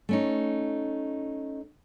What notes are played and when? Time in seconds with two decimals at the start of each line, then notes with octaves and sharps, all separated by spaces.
0.09 A3 C#4 D#4